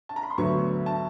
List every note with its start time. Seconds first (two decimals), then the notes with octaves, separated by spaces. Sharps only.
0.09 A5
0.16 A#5
0.23 B5
0.30 C6
0.38 D2 D3 F#3 B3 C#6
0.86 A5